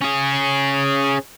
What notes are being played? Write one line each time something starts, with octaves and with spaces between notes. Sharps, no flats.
C#4 G#4